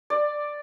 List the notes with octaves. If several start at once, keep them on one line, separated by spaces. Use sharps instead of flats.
D5